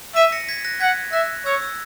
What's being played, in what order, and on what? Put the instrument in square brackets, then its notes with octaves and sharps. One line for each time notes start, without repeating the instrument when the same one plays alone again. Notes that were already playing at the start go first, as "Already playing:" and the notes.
[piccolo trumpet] E5 [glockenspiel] B6 D#7
[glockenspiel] A#6 C#7
G#6 B6
F#6 A#6
[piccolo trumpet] F#5 [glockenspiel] G#6 B6
[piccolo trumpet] E5 [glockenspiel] F#6 A#6
[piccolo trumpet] C#5 [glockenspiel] E6 G#6
[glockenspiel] E6